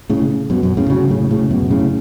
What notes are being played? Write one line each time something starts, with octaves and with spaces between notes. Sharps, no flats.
A2 C#3
F#2 B2
F#2
A2 C#3
C#3 F#3
A2 C#3
A2 C#3
F#2 B2
A2 C#3